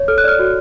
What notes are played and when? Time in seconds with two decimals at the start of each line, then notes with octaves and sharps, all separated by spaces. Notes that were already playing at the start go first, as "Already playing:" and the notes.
Already playing: C#5
0.08 A4 F6
0.18 F#6
0.24 D5 F6
0.39 F#4